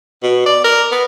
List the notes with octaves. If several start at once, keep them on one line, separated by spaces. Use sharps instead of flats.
B2
D5
A#4
B3